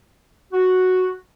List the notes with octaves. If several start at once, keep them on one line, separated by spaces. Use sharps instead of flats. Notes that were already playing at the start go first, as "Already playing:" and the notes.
F#4